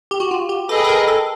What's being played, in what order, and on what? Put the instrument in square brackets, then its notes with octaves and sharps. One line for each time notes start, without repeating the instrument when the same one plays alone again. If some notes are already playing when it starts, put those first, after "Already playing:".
[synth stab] G4
F#4
F4
G4
[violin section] G#4 B4 D#5 G5 [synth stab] A4
[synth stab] A4
A#4
A4